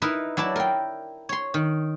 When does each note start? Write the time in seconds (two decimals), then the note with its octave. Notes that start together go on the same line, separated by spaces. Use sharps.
0.02 D#4 E4 A#4 B4
0.37 F#3 E4 D5 A5
0.56 A#4 G5
1.29 C#5 C6
1.54 D#3